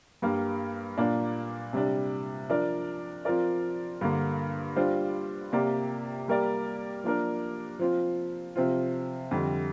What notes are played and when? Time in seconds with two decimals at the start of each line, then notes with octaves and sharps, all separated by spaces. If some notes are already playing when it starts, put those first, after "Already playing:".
0.22 G2 G3 A#3
0.98 A#2 A#3 D4
1.73 C3 G3 D4
2.50 F3 D4 A#4 D5
3.25 F3 C4 F4 A#4 D5
4.01 G2 D3 A#3
4.76 G3 D4 F4 C5
5.52 C3 A#3 G4 D5
6.28 G3 A#3 G4 A#4 D5
7.04 F3 A#3 D4 A#4
7.79 F3 C4 F4
8.56 C3 F3 C4 F4
9.31 F2 D3 G3